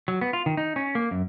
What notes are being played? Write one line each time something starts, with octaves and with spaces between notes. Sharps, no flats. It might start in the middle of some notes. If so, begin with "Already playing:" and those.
F#3
B3
F4
D#3
D#4
C#4
A#3
F#2